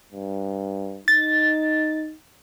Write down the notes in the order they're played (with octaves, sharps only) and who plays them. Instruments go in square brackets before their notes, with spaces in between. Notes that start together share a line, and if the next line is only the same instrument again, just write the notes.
[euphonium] G2
[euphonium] D#4 [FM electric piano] A6